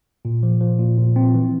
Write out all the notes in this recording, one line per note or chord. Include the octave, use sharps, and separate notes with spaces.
A#2
F3
F3
A#2
A#2
C4
E3